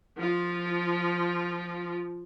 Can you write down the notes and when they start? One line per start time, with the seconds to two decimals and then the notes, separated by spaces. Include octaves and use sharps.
0.17 F3 F4